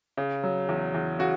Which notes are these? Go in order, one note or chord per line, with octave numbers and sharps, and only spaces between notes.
C#3
F#3
E2
E2
C#3 F#4